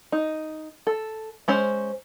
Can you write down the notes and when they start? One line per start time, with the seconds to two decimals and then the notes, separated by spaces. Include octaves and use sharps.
0.12 D#4
0.87 A4
1.48 G#3 C#4 C5